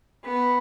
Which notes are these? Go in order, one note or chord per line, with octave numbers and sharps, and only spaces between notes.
B3